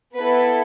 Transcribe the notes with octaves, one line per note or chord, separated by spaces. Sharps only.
B3 E4 A4 B4